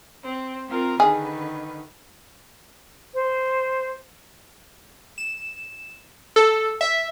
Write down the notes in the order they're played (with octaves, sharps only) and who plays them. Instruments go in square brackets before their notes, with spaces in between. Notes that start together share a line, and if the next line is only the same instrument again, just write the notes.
[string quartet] C4
C4 F4 A#4
[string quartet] D3 D#3 B4 [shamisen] G#4
[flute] C5
[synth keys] E7
A4
E5